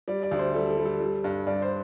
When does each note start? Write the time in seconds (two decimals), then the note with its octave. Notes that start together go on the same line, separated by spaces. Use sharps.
0.08 G3 D5
0.23 D5
0.31 D2
0.39 C5
0.54 G3 A4
0.70 A4
0.78 G3
0.85 A4
1.00 G3
1.24 G2
1.47 G2 D5
1.62 C5